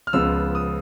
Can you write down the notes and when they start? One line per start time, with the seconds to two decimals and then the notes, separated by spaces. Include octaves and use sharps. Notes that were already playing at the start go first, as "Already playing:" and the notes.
0.07 F6
0.13 C#2 C#3 F3 G#3 B3 E6
0.55 D#6